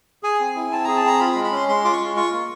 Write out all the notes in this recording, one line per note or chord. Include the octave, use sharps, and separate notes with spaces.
G#4 G#5
C4
E4
C4 A5
G#4 A#5
A5
C4 A#5
F4 B5
B5
G#3
B5
C#4 C6
G#3 C6
F4 D6
C#6
G#3
F4 C#6
A#3